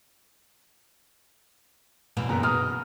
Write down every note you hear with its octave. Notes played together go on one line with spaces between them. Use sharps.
F#2 B2 E3
F#1 B3 A#5
B2 A#5 D#6 F6